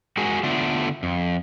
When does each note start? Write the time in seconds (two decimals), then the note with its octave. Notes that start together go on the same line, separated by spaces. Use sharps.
0.17 G#3 F#4 G#4 A#4
0.43 D3 A3 B3 D4 F4
1.03 F2